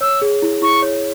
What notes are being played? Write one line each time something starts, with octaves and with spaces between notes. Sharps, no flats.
C#5 E6
G#4
E4
E4 C#6
C#5